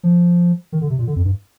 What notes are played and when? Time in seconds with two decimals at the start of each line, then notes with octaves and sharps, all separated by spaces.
0.03 F3
0.72 D#3
0.81 D3
0.90 C3
0.98 A#2
1.07 D3
1.16 F2
1.25 G2